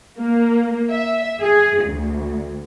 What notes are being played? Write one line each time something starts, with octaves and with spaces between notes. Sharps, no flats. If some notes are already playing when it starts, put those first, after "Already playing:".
A#3
E5
G#4
D2